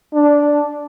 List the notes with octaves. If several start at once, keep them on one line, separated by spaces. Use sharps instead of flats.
D4